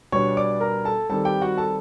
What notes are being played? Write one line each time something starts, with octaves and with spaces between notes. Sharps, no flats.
B2 G3 B3 D4 C#5 C#6
D5 D6
A#4 A#5
A4 A5
D#3 G3 C4 A4 A5
G4 G5
F#4 F#5
A4 A5